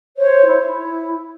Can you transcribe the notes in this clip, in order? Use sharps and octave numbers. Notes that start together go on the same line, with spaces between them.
C5 C#5
E4
E4